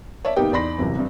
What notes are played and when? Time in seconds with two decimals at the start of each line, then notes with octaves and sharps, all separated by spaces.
0.25 C#5 D5 E5 A5
0.36 C2 A#3 B3 D#4 G4 G5
0.52 E2 D#4 D5 B5 C6 A#6
0.78 G1 F#2 C3 E3
0.96 C2 G2